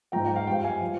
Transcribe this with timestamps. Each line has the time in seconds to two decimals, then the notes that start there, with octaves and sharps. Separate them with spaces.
0.12 F3 G5 A#5
0.16 G#2
0.25 G5
0.36 F5
0.47 G2 F3 G5
0.64 F5 G#5
0.81 F3